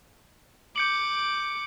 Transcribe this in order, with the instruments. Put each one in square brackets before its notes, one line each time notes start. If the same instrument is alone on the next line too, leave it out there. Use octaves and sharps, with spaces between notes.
[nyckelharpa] D6 [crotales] G6 C#7 F#7